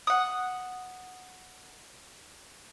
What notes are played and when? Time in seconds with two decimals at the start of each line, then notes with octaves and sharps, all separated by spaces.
0.07 F#5 D#6